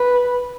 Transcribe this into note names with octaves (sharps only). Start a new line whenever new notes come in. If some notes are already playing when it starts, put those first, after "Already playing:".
Already playing: B4